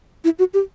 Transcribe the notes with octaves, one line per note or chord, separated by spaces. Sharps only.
E4
F#4
G4